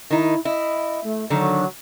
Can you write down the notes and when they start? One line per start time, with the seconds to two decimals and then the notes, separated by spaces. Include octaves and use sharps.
0.10 D#3 D#4 E4
0.45 E4 D#5
1.04 A3
1.30 D3 D#3 F#3